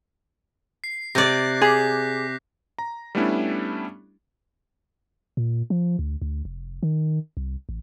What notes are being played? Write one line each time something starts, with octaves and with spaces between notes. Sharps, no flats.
C7
C3 D5 F#6 G6 A#6
G#4 D6 B6
A#5
G3 A3 B3 C#4 D4 E4
A#2
F3
D2
D2
F1
D#3
C2
A1